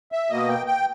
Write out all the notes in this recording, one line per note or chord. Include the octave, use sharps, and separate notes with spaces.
E5
B2 A#3 D#5
G5
G5